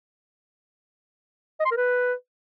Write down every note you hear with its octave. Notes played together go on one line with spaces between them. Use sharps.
D#5
C6
A#4
B4